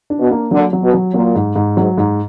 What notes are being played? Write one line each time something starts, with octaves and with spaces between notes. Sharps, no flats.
D4
B2
A#3
D3 F#3
F#3
B2
F#3
A#2 F#3
G#2
G#2
G#2 F#3
G#2